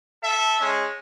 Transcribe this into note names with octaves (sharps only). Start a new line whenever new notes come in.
A4 E5
G#3 C#4